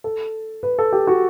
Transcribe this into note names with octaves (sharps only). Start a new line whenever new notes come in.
A4
B4
A4
G4
F#4